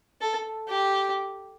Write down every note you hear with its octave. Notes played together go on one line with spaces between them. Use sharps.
A4
G4